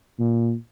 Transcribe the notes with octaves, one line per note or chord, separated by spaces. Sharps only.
A#2